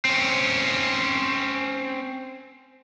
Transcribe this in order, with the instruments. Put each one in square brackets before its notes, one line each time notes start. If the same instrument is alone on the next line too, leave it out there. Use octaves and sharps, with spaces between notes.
[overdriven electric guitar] C4 C#4